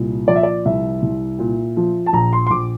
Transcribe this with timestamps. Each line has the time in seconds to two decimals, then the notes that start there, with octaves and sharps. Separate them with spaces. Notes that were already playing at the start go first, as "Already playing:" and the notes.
Already playing: C2 A#2
0.27 F3 D5
0.36 E5
0.43 D5
0.65 C2 E5
1.02 C2
1.39 A#2
1.77 F3
2.06 A5
2.13 A#1 A#5
2.33 C6
2.47 C6
2.50 A#1 D6